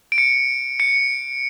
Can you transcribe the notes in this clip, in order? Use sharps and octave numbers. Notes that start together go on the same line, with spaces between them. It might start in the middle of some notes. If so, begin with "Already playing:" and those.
D7
C#7
C#7